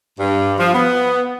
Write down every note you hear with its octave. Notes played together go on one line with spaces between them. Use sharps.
G2
F3
B3